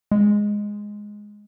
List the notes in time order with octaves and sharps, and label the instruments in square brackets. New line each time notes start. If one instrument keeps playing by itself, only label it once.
[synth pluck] G#3